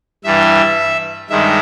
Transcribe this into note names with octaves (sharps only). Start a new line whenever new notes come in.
G2 E3 G3 E5
G2 D#3 G#3 E5